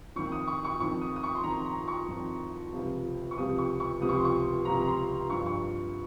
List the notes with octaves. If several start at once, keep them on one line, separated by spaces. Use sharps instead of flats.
F2 D#3 C#6
D#6
C#6
C#6
F2 D#3 C#6
D#6
D#6
C#6
C6
F2 D#3 A#5
A#5
C#6
F2 D#3
C#2 C3 F3
C#6
C#2 C3 F3 D#6
C#6
C#6
C#2 C3 F3 D#6
C#6
C6
C#6
C#2 C3 F3 A#5
A#5
C6
G2 F3 C#6
C#6